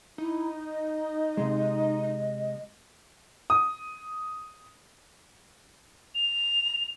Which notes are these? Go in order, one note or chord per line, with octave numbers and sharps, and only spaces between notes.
D#4 E4
D#5
C3 G#3
D#6
F7